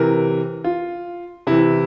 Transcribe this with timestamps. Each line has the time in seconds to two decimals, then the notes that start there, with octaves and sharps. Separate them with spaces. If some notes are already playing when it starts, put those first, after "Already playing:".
Already playing: C3 E3 A#4
0.64 F4
1.47 C3 E3 E4